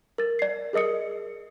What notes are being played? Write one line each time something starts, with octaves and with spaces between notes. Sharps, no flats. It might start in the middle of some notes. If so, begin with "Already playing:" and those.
A#4 A6
D5 C7
G#4 A#4 D#5 D#6 C#7